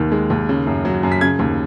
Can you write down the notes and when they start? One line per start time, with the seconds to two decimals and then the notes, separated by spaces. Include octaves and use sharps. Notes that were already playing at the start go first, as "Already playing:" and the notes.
Already playing: D#2 D#3
0.12 G#3
0.30 D#2
0.49 C#3
0.67 F#2
0.85 F#3
1.03 F#2
1.12 B6
1.21 C#3 G#6
1.39 D#2